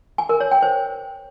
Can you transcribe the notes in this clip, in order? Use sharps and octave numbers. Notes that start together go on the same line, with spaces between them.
G#5
A#4
C#5
G5
C5